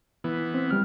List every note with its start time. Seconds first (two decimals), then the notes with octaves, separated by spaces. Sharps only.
0.24 E3 B3
0.54 C4
0.70 G3 F6